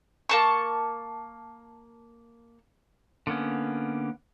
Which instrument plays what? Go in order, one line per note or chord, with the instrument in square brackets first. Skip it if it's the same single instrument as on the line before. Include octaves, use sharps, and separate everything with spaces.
[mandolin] A#3 A5 C#6
[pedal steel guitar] D3 A#3 B3 C#4